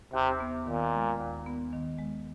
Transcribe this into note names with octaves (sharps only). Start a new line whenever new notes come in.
D#2 C3
B3
A#2 D#3
G#3
D#2
B3
D#3
G#3